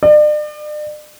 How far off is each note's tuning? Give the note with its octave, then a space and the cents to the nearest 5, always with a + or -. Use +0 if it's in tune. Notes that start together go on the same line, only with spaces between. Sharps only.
D5 +40